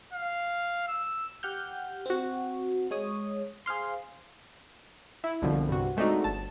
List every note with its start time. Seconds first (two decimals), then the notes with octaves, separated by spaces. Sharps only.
0.14 F5
0.88 E6
1.43 G4 F#5 F6 G6
2.06 C4 F#4
2.91 G#3 C#5 D#6
3.66 G#4 C5 F5 C6
5.24 E4
5.42 C2 B2 D3 F3
5.69 G2 C3 F#4
5.97 G#3 A3 C4 D4 D#4 F#4
6.24 G1 A5